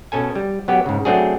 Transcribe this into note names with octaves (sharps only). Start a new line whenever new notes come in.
B2 C#4 A4 G#5
G3
F#3 B3 G4
G#2 C#3
F#3 A3 C4 D4 F#4 G#4